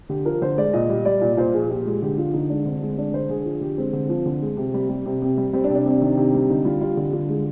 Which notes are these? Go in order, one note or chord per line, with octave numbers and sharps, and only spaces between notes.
D3 G4
F3 A#4
D3 C5
G#3 D5
A#2 D#5
G3
G3 D5
A#2
A#2 C5
F3 G#4
A#2 G4
G#3
D3 G4
F3 F4
D3 D#4
G#3 D4
D3 C4
G#3
G#3 D4
D3 C5
D3 G#4
F3
D3 G4
G#3 C4
D3
F3
D3
G#3
C3
G3
G3
C3
C3
G3
G3 C4
D4
C3
D4
C3
D#3
C3
G3
D3 D#4
G3 F4
G3 F4
D3 G4
D3 F4
G#3